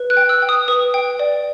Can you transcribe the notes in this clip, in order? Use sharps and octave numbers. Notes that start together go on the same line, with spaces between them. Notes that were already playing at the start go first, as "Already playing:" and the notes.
Already playing: B4
F#6
G5
E6
G5
D#6
B4 D#6
G5
D5